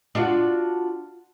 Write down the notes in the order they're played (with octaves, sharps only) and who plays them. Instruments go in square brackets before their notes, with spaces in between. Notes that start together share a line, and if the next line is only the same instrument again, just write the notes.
[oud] D4 F4 F#4